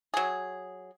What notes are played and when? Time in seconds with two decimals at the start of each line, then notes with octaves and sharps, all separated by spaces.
0.14 F#3 G#4